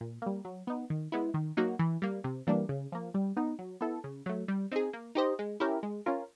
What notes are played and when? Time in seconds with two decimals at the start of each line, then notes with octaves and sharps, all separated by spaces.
0.01 A#2
0.22 G3 A#3
0.45 F#3
0.67 B3 D#4
0.90 D#3
1.12 G#3 B3 E4
1.34 D#3
1.57 F#3 A#3 D#4 F#4
1.79 E3
2.02 G3 A#3
2.24 C3
2.47 E3 G3 A#3 D4
2.69 C#3
2.92 F3 A#3
3.14 G3
3.37 B3 D#4
3.59 F#3
3.81 B3 E4 A4
4.04 C#3
4.26 F#3 A3
4.48 G3
4.71 C4 D#4 G#4
4.93 A#3
5.15 D#4 G4 C5 D#5
5.39 G#3
5.60 C#4 E4 G4 A#4
5.83 G#3
6.06 C#4 F4 A#4